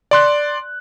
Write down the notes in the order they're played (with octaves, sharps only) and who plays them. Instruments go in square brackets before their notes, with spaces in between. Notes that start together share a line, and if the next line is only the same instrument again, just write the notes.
[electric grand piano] D5 C6 F#6